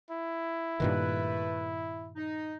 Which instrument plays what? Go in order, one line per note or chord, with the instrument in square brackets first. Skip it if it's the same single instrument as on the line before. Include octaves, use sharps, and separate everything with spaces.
[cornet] E4
[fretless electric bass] G2 A#2 D#3 [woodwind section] A3 B4
[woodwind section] D#4